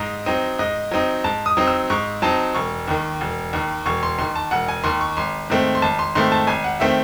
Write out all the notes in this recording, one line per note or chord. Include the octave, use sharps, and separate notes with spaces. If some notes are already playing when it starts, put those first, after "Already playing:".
Already playing: G#2 D#5
F#3 C4 D#4
G#2 D#5
F#3 C4 D#4
G#2 A5
D#6
F#3 C4 D#4
E6
G#2 C#6
F#3 C4 D#4 A5
E1 C#6
D#2 D#3
E1
D#2 D#3
E1 C#6
C6
D#2 D#3 C6
A5
E1 F#5
G#5
D#2 D#3 C6
C#6
G#1 C6
G#2 D#3 A3 C4
C6
G#1 A5
C6
G#2 D#3 A3 C4 C6
A5
G#1 G#5
F#5
D#3 A3 C4 E5